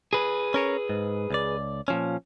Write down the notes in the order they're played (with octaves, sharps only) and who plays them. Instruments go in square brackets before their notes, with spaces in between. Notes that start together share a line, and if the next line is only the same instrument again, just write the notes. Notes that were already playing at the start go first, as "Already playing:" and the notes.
[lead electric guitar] G#4 B4
[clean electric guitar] C#4 A#4 C#5
G#2
C#2 D5
A#2 F3 C#4